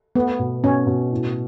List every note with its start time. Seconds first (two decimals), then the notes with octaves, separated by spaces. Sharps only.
0.15 A3 B3
0.39 B2
0.64 B2 C#4
0.87 B2
1.12 A2